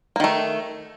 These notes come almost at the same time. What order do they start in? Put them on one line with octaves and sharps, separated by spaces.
A#3 D#3 A3